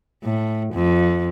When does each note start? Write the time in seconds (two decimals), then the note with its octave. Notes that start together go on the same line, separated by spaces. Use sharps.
0.24 A2
0.74 F2